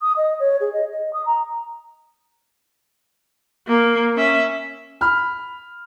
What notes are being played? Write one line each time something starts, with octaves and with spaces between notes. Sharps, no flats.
D#6
D#5
C#5
G#4
D#5
D#5
D#6
A#5
A#3
C#4 E5
B5 F6